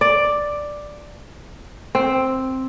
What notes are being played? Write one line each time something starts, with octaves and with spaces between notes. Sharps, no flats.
D5
C4